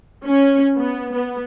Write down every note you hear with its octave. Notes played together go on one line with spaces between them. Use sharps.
C#4
B3
B3